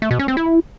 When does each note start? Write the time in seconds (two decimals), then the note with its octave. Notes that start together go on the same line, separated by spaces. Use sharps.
0.02 A3
0.11 B2
0.19 C#4
0.28 C4
0.37 E4